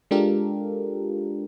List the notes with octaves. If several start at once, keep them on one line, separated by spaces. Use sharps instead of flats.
G#3 D4 F4 G4 A4 A#4